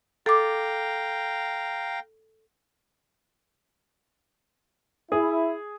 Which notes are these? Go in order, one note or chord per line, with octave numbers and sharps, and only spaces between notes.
A4 F5 G5 A#5 D6
E4 G#4